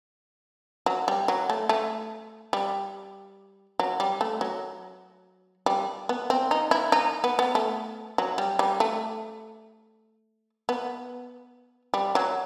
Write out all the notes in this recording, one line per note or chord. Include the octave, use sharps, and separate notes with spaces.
F#3
G3
F#3
A3
A3
G3
F#3
G3
A3
F#3
G3
B3
C4
D#4
E4
D#4
B3
B3
A3
F#3
G3
G3
A3
B3
G3
F#3